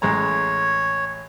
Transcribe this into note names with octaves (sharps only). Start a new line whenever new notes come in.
A1 G#3 C#5 A#5